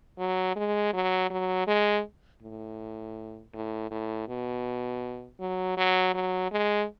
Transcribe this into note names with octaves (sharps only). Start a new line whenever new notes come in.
F#3
G#3
F#3
F#3
G#3
A2
A2
A2
B2
F#3
F#3
F#3
G#3